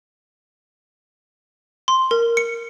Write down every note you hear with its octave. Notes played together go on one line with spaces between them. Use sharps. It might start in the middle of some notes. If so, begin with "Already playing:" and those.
C6
A#4
C#7